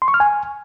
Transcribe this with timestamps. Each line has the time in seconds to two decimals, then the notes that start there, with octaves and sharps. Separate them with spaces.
0.02 C6
0.08 C#6
0.14 F6
0.20 G#5